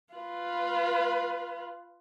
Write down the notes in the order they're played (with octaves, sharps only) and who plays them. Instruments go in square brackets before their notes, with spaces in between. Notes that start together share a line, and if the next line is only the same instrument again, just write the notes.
[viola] F4 B4